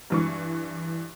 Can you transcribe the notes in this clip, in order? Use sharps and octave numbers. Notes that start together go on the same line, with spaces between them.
G2 E3 C#6